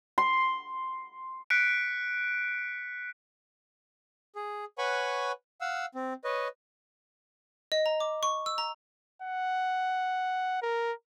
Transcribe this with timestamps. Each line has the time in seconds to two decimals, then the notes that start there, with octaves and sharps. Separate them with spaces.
0.18 C6
1.50 F#6 B6 C#7 D7
4.35 G#4
4.78 B4 C#5 F#5 G#5 B5 C#6
5.61 F5 F#5 E6
5.95 C4
6.24 B4 C#5 D#5
7.72 D#5
7.86 A#5
8.00 D6
8.23 C#6
8.46 E6
8.58 A#5
9.22 F#5
10.62 A#4